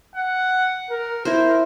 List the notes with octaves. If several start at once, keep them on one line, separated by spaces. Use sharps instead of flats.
F#5
A#4
E4 A#4 C5